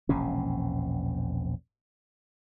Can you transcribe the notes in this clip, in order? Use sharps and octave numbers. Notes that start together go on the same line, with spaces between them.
E1 A#1 C3 C#4